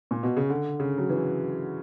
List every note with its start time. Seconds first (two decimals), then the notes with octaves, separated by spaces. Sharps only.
0.11 A#2
0.23 B2
0.37 C#3
0.50 D3
0.80 C#3
0.98 F#3
1.10 E3